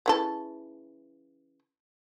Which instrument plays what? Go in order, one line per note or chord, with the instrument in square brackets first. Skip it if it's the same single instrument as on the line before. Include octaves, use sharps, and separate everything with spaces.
[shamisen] C#3 E3 A4